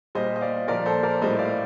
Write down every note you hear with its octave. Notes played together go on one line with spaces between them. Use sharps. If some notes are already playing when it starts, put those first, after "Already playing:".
A#2 G3 C5 D#5
D#5
D5 F5
A#2 F3 A#4 D5
A4 C5
A#4 D5
A2 G3 C5 D#5
D5 F5